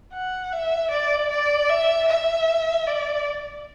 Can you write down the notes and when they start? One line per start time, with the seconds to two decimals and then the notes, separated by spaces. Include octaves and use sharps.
0.13 F#5
0.52 E5
0.91 D5
1.30 D5
1.70 E5
2.09 E5
2.87 D5